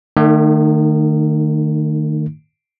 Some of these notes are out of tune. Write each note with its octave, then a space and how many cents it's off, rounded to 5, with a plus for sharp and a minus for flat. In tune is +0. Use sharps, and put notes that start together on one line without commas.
D#3 -30 A3 +30 D#4 +0